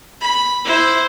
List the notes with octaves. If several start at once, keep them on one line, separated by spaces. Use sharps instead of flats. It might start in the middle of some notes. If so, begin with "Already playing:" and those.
B5
E4 C5